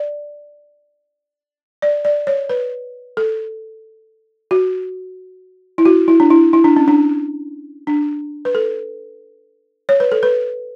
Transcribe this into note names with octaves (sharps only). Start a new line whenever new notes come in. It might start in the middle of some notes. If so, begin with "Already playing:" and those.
Already playing: D5
D5
D5
C#5
B4
A4
F#4
E4
F#4
E4
D4
E4
E4
D4
C#4
D4
D4
B4
A4
C#5
B4
A4
B4